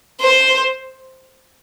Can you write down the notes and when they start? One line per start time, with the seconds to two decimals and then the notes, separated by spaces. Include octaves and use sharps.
0.20 C5